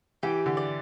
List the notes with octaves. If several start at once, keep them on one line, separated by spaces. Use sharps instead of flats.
E3 G4
D3
D5